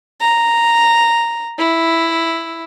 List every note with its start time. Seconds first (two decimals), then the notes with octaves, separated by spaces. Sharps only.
0.21 A#5
1.59 E4